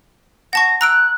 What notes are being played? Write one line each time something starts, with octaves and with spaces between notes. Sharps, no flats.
F#5 A5 C#6 A#6
A#5 E6 F#6 D7